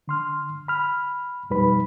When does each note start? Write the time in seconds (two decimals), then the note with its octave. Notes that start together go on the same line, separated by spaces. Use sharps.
0.08 D3 C6 F6
0.68 B5 F6
1.50 F2 B2 G3 D#4 B4 B5